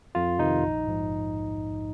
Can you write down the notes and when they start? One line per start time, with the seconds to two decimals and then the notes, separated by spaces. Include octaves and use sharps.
0.15 F2 F4
0.39 C3 D#3 D#4
0.64 A#1
0.87 G#2 F3